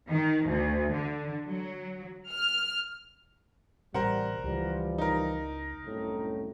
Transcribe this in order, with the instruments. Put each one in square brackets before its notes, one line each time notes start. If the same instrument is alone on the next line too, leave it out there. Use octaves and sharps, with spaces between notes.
[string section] D#3
D2
D3
F#3
F6
[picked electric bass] A1 C3 [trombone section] G3 [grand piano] A#4 C5 F#5
[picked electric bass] C#2 [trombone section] E3 F3 G3
[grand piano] D#4 A#4
[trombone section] C2 F#2 A2